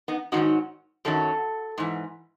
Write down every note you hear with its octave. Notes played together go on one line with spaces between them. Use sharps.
B3 D#4
G#2 D#3 F#3 D#4 F#4
F#2 D#3 F#3 A4
G#2 E3